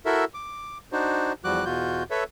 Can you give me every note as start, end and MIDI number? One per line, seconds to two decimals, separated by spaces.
0.06 0.25 64
0.06 0.25 66
0.06 0.25 69
0.06 0.25 70
0.06 0.25 76
0.34 0.78 86
0.92 1.33 62
0.92 1.33 63
0.92 1.33 66
0.92 1.33 72
1.44 1.65 40
1.44 1.65 53
1.44 1.65 55
1.44 1.65 66
1.44 1.65 86
1.44 1.65 90
1.65 2.03 40
1.65 2.03 47
1.65 2.03 65
1.65 2.03 66
1.65 2.03 91
2.11 2.24 69
2.11 2.24 71
2.11 2.24 73
2.11 2.24 76